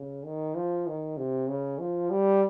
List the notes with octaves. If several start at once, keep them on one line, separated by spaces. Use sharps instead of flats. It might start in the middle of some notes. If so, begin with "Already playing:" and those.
Already playing: C#3
D#3
F3
D#3
C3
C#3
F3
G3